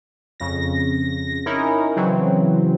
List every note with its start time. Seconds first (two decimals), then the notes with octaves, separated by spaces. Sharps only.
0.40 F2 C#3 A#6
1.46 C#4 D#4 E4 A#4
1.96 C#3 E3 F#3 C4